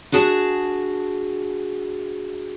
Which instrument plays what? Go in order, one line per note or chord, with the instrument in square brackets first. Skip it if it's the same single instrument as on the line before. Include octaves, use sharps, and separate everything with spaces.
[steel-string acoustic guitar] D4 F#4 G#4 A5